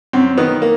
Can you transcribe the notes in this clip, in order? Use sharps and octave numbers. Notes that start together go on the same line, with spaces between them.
F#2 C4
D#3 B3
A#3